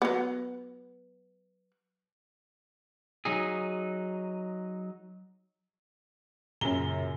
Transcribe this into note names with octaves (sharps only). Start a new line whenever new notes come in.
F#3 B3
F#3 D#4 G#4
F#2 A#2 C#3 A#5 G7